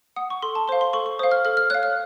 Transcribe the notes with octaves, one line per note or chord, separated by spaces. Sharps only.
F#5 D#6
C#6
A4 C6
A5
C5 F5 C6
C6
A4 C#6
C#6
C5 F5 D#6
F6
A4 F6
F6
C#5 F5 F#6
F6